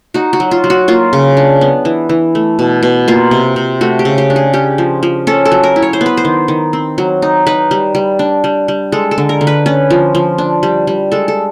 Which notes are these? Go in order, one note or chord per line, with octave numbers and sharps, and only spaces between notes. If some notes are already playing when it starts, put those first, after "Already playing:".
D#4 F#4
F#4
F#3
F4
F#3
F#4
A#3 F4
C#3
D4
B3
E3
E3
A3
B2
B2
A#3 F4
C3
C3
A3 F#4
G4
C#3
G4
D4
G#4
C#4 G4
F3
F3
C#4 A4
A4
F#3
A#4
E4
C#5
C5
B3
B4
C5
D#3
D#3
C4
F#3
D#4
D#4 B4
G3
G3
D4
G3
G3
G#3 A4
A4
D3
A#4
D3
B4
C#4 B4
F3
F3
D4
G3
G3
G#3 A4
A4